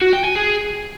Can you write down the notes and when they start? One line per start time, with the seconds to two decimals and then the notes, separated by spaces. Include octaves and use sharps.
0.01 F#4
0.13 G5
0.24 G#5
0.35 G#4